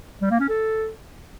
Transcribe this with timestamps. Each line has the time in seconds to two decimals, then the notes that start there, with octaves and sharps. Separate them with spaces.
0.21 G3
0.31 A#3
0.40 C#4
0.49 A4